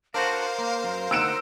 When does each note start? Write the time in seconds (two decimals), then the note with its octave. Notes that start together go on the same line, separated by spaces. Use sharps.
0.14 D4 F#4 A#4 C5 F5
0.58 A#3
0.84 F#2
1.11 D2 D#4 F#5 E6 D7 E7